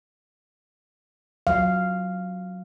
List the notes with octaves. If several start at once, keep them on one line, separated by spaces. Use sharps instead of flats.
F#3 F5